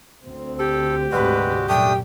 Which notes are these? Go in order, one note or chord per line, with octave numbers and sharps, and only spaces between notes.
D2 C4
G4 A4
D2 G#2 C3 G3 G#3 F#4 B4
F#2 A#2 G3 A3 D4 G5 D#6